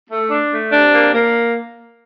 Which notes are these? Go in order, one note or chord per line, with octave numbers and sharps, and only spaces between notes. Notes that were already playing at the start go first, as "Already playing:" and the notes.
A3
D4
A3
C3 D4
A#3
A#3